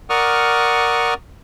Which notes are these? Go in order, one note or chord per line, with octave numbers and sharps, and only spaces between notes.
A#4 D5 F#5 C#6 D#6 F6